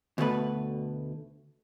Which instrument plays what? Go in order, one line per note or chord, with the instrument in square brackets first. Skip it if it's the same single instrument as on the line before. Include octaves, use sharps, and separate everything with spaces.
[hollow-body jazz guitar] D2 B2 A3 B4